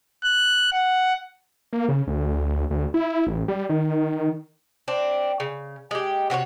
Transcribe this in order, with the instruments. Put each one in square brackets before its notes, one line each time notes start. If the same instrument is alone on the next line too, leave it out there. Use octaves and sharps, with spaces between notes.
[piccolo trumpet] F#6
F#5
[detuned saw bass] A#3
C#3
D2
D2
E4
A1
G3
D#3
[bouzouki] C4 D4
C#3
G#3 G4
C3 F#4 B4 C#5